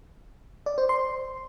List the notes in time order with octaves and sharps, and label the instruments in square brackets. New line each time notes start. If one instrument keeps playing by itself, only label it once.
[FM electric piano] D5
C5
C6